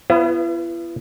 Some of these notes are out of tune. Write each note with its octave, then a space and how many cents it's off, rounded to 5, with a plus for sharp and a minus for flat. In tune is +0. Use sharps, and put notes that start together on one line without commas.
B3 +0 E4 +45 B4 +35